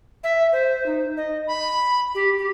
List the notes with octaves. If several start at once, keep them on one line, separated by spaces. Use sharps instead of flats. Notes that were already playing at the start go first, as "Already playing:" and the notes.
E5
C5
D#4
D#5
B5
G4
G4